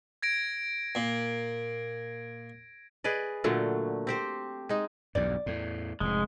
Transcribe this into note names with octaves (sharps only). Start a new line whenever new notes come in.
G#6 A#6 D7
A#2
G#4 B4 D5 D#5
A#2 D3 F#3 A3
C4 G4 C5
G#3 D#4
B1 E2 G2 D5
E2 A2
F1 G#2 G#3